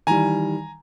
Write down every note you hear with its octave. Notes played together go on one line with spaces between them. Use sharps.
D#3 E3 G3 G#5 A#5